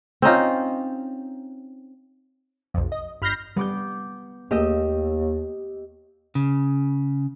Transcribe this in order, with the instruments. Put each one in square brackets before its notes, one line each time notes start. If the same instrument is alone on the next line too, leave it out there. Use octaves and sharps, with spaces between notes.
[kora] C4 C#4 D#4 F4
[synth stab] B1 F2
D#5
G1 B5 F6 G6 A#6 C7
[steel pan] G3 [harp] B3 D6 G6
[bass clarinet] D#2 [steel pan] A3 A#3 G#4 [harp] G4 D#5 E6
[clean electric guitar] C#3